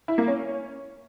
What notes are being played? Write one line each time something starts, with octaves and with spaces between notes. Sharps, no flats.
E4
A#3
C#4